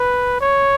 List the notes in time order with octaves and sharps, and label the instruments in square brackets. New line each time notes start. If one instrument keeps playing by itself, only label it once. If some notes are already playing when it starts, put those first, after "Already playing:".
Already playing: [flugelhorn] B4
C#5